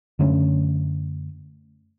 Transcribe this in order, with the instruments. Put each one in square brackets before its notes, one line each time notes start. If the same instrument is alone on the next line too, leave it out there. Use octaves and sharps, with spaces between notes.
[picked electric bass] F#2 D3 A3 C#4